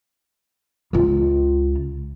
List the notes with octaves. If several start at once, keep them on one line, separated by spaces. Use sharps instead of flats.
C#2 F4